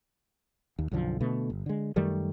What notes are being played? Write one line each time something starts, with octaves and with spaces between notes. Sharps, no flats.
D#2
B1 F#2 D3 F3
B2 D3 A3
G1
D3 G#3
F#2 D#3 G3 A3